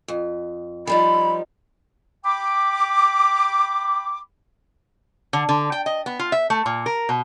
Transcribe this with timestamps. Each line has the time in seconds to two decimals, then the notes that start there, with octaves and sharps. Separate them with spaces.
0.08 F2
0.87 F3 G3 D#4 B5
2.24 G5 B5 D6
5.33 D3
5.49 D3
5.72 G5
5.86 D#5
6.06 B3
6.19 F4
6.32 E5
6.50 A3
6.66 A#2
6.86 A#4
7.09 B2